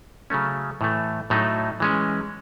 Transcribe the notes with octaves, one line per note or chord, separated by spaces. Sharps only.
C#3 F#3 A3 C#4
A2 E3 A3
A2 F#3 A3 D#4
E3 G#3 C#4